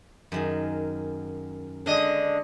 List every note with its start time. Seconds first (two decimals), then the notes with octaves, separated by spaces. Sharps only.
0.32 F#2 D#3 G#4
1.86 D3 G#3 D4 D#5